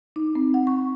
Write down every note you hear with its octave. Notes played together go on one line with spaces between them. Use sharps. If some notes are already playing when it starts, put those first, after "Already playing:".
D#4
C4
F#5
C#6